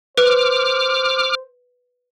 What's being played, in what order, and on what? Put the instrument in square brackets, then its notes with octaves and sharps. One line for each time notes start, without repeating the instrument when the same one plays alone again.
[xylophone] B4 [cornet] C5 [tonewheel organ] D6 F6